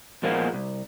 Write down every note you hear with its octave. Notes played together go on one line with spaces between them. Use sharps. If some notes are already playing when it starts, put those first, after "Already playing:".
A#2 F3 G#3 A#3 B3
C2